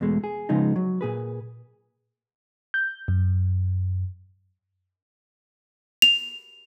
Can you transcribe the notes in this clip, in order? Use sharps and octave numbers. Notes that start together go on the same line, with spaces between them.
E2 B2 G#3 A3
G#4
C#3 F3 G#3 B3 D#4
F#3
A#2 G#4 B4
G6
F#2
F7